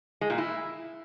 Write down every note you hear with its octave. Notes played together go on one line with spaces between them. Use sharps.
G#3
A#2
E4